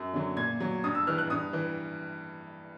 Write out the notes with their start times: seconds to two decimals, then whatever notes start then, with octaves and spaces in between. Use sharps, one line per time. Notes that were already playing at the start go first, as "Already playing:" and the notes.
Already playing: F#2
0.14 D3 F#3
0.36 A#2 G#6
0.60 F#3
0.84 G2 D#6
0.95 E6
1.07 E3 F6
1.18 F#6
1.30 G2 D#6
1.53 E3